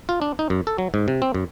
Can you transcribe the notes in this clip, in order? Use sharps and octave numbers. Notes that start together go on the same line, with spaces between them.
F4
D4
D#4
F#2
A4
F#3
G#2
C3
C4
F#2